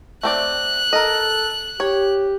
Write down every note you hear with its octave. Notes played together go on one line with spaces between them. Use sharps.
A3 C4 D5 F#6
A4 A#4 D#5
G4 C#5